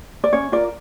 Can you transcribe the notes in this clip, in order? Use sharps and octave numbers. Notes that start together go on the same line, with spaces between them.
D5
C#4 C#5
F4 A#4 D5